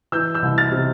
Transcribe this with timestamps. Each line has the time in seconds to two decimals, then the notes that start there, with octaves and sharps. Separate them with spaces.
0.12 E3 E6 G6
0.34 E6 G6
0.42 C2
0.58 F6 A6
0.72 C3